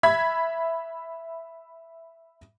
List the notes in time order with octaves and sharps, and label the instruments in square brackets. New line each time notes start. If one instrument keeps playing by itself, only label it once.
[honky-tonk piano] E5 B5 G#6 B6